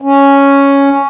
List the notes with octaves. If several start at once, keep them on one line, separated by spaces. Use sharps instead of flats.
C#4